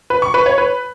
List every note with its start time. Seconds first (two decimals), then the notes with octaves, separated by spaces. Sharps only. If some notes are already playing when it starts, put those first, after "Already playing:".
0.10 B4
0.22 C#6
0.34 B4
0.46 C#5
0.58 B4